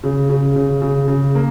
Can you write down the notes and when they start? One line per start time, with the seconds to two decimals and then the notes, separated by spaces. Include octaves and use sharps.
0.03 C#3
0.29 C#3
0.56 C#3
0.82 C#3
1.08 C#3
1.35 A#3